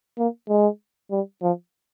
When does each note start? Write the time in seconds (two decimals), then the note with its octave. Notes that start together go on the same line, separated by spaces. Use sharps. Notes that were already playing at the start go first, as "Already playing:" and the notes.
0.18 A#3
0.49 G#3
1.11 G3
1.42 F3